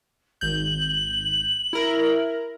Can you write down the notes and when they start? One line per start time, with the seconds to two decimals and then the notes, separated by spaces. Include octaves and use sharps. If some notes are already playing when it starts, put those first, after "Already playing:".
0.41 G#1 G6 F#7
1.73 E4 A#4